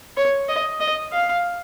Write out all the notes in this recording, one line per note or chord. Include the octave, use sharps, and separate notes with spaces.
C#5
D#5
D#5
F5